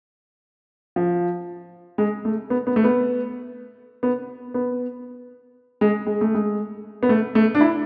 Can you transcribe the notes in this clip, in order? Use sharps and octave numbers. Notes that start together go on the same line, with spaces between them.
F3
G#3
A3
B3
B3
A3
B3
B3
B3
G#3
G#3
A3
G#3
B3
A3
A3
D4
E4